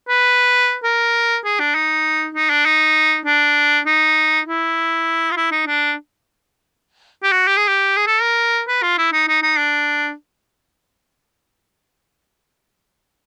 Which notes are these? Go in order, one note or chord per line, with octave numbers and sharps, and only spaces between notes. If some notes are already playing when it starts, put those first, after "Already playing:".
B4
A#4
G#4
D4
D#4
D#4
D4
D#4
D4
D#4
E4
F4
E4
D#4
D4
G4
F#4
G4
G#4
G4
G#4
A4
A#4
B4
F4
E4
D#4
D#4
D#4
D4